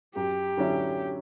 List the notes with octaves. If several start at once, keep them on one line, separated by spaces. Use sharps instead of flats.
F#2 G4
D3 F#3 C#4 E4